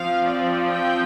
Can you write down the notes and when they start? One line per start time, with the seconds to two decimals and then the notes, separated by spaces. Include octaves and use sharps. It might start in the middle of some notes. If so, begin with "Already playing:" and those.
Already playing: F3 C4 F5
0.25 D5
0.72 G5